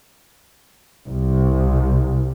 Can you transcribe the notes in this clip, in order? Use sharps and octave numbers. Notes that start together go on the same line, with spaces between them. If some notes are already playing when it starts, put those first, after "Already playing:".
C2